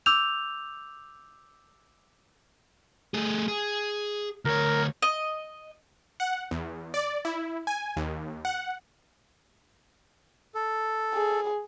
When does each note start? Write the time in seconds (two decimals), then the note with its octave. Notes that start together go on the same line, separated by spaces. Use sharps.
0.06 D6 E6 G6 F7
3.14 A3 G#4
3.48 G#4
4.45 D2 A#4 C#5
5.02 D#5
6.20 F#5
6.51 E2
6.94 D5
7.25 E4
7.67 G#5
7.96 D#2
8.45 F#5
10.55 A4
11.15 G#4